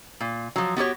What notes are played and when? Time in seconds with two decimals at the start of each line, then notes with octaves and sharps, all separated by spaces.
0.21 A#2
0.56 F3 F#3
0.76 B3 F#4 G4 C#5